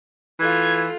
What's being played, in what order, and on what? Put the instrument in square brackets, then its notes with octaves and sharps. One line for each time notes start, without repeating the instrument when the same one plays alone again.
[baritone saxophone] E3 [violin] A3 F4 [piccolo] G#6